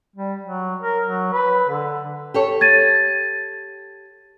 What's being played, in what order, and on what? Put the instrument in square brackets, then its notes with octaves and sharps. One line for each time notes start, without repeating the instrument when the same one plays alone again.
[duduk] G3
F#3
A#4
F#3
B4
D3
[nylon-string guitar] G4 A4 C#5
[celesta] G#6 A6 D#7